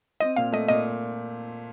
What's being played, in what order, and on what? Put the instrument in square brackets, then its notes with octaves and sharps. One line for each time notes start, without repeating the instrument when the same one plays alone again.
[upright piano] C4 [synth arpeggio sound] D#5
[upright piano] A#2 [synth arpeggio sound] F5
[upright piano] A3 [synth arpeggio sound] D#5
[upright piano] A#2 [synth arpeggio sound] D#5